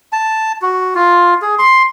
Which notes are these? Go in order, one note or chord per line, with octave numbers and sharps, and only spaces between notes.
A5
F#4
F4
G#4
C6